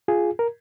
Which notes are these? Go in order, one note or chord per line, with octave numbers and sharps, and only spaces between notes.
F4 G#4
A#4